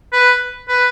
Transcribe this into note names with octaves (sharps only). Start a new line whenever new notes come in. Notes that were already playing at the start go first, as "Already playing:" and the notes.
B4
B4